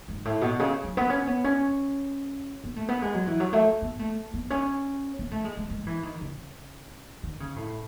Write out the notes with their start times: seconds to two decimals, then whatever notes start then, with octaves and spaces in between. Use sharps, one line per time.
0.08 G#2
0.25 A2
0.41 B2
0.59 C#3
0.84 F#3
0.97 B3
1.10 C#4
1.27 B3
1.44 C#4
2.64 B3
2.76 A3
2.89 B3
3.02 G#3
3.15 F#3
3.27 E3
3.40 F#3
3.53 A3
3.82 B3
3.99 A3
4.34 B3
4.50 C#4
5.19 B3
5.31 A3
5.44 G#3
5.57 G#3
5.70 G#3
5.87 E3
6.03 D#3
6.21 C#3
7.23 D#3
7.40 C#3
7.56 A2